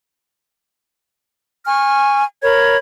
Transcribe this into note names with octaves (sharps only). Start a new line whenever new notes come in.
G#5 C#6 F6
A#4 C#5 B5 G#6